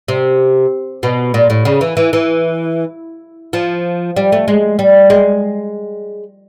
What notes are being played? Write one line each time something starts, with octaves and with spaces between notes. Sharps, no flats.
C3
B2
A#2
A2
C#3
E3
E3
E3
F3
G3
A3
G#3
G3
G#3